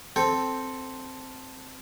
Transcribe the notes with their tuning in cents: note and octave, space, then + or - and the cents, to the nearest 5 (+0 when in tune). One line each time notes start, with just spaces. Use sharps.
C4 +0 A4 +0 G5 +0